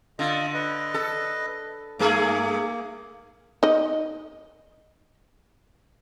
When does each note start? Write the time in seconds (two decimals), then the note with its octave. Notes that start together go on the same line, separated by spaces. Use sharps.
0.19 D3 F4 D#5
0.54 B4 D#5
0.94 A4
1.99 G2 A3 A#3 G#4
3.63 D#4 D#5